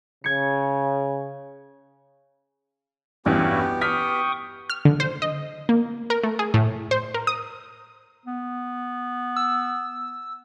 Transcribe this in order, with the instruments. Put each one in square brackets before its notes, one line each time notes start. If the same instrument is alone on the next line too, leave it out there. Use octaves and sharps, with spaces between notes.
[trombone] C#3 [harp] G#6 C#7
[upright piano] A1 E2 G2 [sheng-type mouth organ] B3 G4 [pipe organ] C#4 E4 F#4
[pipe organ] G5 C#6 D#6 [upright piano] F6 B6
[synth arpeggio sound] F6
D3
C5
D#5
A#3
A#4
A3
G#4
A2
C5
A#4
D#6
[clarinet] B3
[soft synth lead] E6